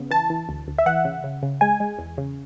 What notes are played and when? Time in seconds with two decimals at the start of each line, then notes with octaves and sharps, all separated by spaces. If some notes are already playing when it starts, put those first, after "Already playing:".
Already playing: C#3 B3
0.10 E3 A5
0.30 E3
0.49 D2
0.68 D2
0.78 E5
0.86 E3 F#5
1.05 C#3
1.24 C#3
1.43 C#3
1.61 G#3 G#5
1.80 G#3
1.98 E2
2.18 C#3